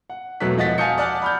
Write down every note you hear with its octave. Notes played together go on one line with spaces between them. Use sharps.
F#5
E1 B2 F#3 A3 F#6 B6
E1 F3 D#5 F#5 A6 B6
F5 G#5 A5 D#6 G6 C#7
D5 F#5 A5 F6 F#6
B5 F6 G6